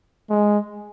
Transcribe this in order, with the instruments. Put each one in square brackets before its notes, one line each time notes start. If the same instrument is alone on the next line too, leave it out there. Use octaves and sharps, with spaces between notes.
[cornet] G#3